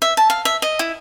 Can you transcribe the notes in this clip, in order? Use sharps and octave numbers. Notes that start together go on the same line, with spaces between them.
E5
A5
F5
E5
D#5
E4